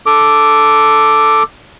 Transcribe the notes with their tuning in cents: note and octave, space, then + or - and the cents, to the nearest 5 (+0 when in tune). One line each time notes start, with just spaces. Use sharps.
A4 +0 D6 +0